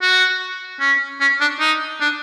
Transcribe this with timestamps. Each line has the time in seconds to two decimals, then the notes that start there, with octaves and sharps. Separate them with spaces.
0.02 F#4
0.80 C#4
1.21 C#4
1.41 D4
1.60 D#4
2.01 D4